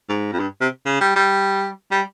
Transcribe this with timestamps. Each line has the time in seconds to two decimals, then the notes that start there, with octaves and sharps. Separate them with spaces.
0.09 G#2
0.32 F2
0.40 G2
0.61 C3
0.86 C#3
1.01 G3
1.16 G3
1.91 G3